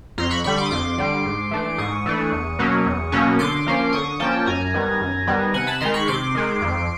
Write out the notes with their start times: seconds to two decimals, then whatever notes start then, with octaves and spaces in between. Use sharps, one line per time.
0.18 F2 A#5 C6
0.30 B5 C#6
0.44 D3 G3 B5 C#6
0.57 C6 D6
0.66 D#6
0.71 F2 C6 D6
0.98 D3 G3
1.26 G#2
1.51 E3 A3 D4
1.78 G#2 C#6 D#6
2.06 E3 A3 D4
2.32 E2
2.59 B2 F#3 A#3 C#4
2.86 E2
3.12 B2 F#3 A#3 C#4
3.39 D3 C6 D6
3.67 F3 A#3 C#4
3.93 D3 C#6 D#6
4.20 F3 A#3 C#4 G5 A5
4.46 F#2 G#5 A#5
4.74 D#3 G3 B3
5.01 F#2
5.27 D#3 G3 B3
5.54 C3 F#5 G#5
5.67 A5 B5
5.80 D#3 G#3 A#5 C6
5.94 B5 C#6
6.08 C3 C6 D6
6.35 D#3 G#3
6.62 F2